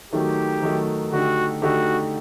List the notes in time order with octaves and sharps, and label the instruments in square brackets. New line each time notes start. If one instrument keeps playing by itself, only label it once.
[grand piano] D#3 F#3 A3 D#4 [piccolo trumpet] G4
[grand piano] D#3 F#3 A3 D#4
[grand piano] D3 A3 D#4 G4 [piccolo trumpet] F#4
[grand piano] D3 A3 D#4 G4 [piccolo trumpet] F#4